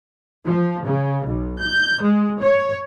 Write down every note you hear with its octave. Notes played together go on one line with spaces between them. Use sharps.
F3
C#3
B1
G6
G#3
C#5